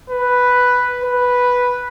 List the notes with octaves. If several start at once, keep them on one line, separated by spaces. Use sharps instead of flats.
B4
B4